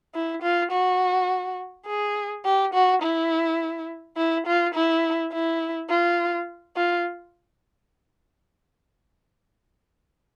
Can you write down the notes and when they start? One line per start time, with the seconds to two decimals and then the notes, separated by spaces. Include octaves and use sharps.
0.14 E4
0.42 F4
0.71 F#4
1.86 G#4
2.45 G4
2.74 F#4
3.02 E4
4.17 E4
4.47 F4
4.74 E4
5.32 E4
5.89 F4
6.76 F4